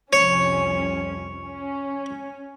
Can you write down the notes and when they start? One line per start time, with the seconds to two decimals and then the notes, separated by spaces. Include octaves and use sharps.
0.13 C2 F2 C#4 C#5
1.47 C#4